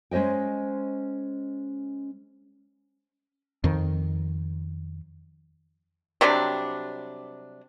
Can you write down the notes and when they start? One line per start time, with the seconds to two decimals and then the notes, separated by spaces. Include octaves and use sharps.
0.11 G#3 C#4 C5 D#5 G5
3.64 F2 D#3
6.21 C3 F#3 G3 D4